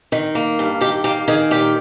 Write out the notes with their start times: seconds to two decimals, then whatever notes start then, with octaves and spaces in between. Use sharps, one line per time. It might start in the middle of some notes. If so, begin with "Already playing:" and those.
0.12 D#3
0.35 A#3
0.59 G2
0.81 D#3 G4
1.04 A#3 G4
1.28 D#3 G#4
1.51 A#2 G4